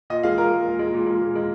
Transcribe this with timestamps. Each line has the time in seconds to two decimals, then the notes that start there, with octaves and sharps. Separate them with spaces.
0.10 A#2 D#5
0.23 G#3 F5
0.38 A#2 A#4
0.52 G#3
0.65 A#2
0.79 G#3
0.94 A#2
1.07 G#3
1.21 A#2
1.35 G#3